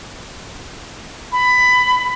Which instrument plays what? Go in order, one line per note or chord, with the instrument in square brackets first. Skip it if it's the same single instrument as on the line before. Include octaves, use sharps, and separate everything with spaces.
[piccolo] B5